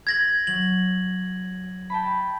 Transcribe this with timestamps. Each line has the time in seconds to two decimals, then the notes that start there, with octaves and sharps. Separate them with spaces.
0.07 G#6 A#6 F#7
0.47 F#3 F#7
1.90 G5 A5 B5